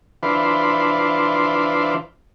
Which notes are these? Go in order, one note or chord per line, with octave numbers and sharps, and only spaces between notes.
E3 D4 F4 B4 C5